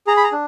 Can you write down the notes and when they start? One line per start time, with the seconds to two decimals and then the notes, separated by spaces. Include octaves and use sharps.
0.07 G#4 A#5
0.17 B5
0.24 A#5
0.32 D4